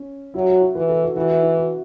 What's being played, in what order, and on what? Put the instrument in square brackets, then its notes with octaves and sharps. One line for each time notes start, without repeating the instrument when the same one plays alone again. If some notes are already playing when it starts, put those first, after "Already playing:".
Already playing: [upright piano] C#4
[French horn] F#3 [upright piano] E4
[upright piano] F#4
E4
[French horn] E3 [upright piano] B4
[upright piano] A4
F#4
[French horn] E3 [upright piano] F#4
[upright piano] E4
E4
F#4